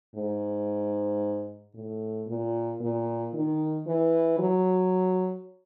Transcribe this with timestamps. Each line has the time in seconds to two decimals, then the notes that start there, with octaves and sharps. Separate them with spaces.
0.15 G#2
1.74 A2
2.27 A#2
2.81 A#2
3.34 D#3
3.87 E3
4.39 F#3